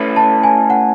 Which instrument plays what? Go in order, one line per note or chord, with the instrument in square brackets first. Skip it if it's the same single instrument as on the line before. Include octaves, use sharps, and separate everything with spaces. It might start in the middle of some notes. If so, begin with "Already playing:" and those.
Already playing: [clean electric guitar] A3 C#4 E4 B4
[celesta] A5
G#5
F#5